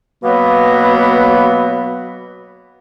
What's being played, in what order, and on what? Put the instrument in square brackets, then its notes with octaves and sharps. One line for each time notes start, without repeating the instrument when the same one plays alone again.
[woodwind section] B2 F#3 A#3 B3 B4